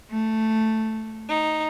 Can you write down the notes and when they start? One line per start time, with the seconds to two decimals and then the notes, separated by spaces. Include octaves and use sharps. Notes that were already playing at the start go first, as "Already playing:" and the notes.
0.11 A3
1.29 D#4